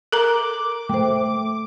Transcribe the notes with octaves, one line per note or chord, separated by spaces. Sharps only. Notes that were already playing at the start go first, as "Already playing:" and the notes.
A4 A#4 A#5 D6
A3 C5 G5